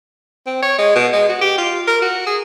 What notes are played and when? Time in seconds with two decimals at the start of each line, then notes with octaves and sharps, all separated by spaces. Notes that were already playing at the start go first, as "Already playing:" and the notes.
0.47 C4
0.63 C#5
0.78 G#3
0.95 B2
1.13 G#3
1.29 F#4
1.41 G4
1.58 F4
1.88 A#4
2.02 F#4
2.27 G#4